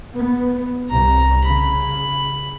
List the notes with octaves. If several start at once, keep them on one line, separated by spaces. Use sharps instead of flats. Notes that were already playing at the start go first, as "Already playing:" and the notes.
B3
C2 A#5
C#3 B5